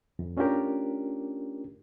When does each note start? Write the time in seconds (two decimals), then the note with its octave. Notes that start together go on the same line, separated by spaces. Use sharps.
0.19 F2
0.37 A3 C#4 D4 F4 G4 A#4